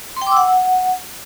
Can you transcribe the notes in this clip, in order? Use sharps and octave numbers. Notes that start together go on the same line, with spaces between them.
C6
G5
D6
E6
F#5